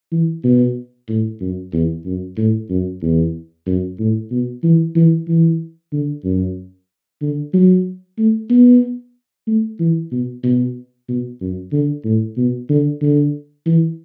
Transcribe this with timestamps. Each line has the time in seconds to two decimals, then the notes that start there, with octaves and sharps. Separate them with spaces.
0.12 E3
0.44 B2
1.09 A2
1.40 F#2
1.73 E2
2.05 F#2
2.37 A2
2.70 F#2
3.02 E2
3.67 F#2
3.99 A2
4.31 B2
4.63 E3
4.96 E3
5.28 E3
5.92 D3
6.24 F#2
7.21 D3
7.54 F#3
8.18 A3
8.50 B3
9.47 A3
9.80 E3
10.11 B2
10.44 B2
11.08 B2
11.41 F#2
11.72 D3
12.04 A2
12.37 B2
12.69 D3
13.02 D3
13.66 E3